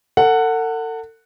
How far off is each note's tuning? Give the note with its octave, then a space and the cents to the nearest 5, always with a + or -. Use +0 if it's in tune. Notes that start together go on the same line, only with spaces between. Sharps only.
A4 +40 F#5 +0